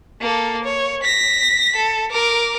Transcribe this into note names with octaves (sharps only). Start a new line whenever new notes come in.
A#3 A4
C#5
A#6 B6
A4
A#4 D6